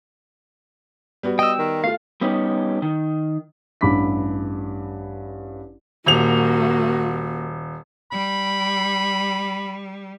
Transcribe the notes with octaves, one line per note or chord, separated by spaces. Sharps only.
G3 B3 F#4
D#5 G5 E6
D#3
A3 F4 F5
G3 B3 C#4 D#4 G4
D#3
A1 G2 B5 D6 B6
D#1 A#3 F#4 F7
G3 B5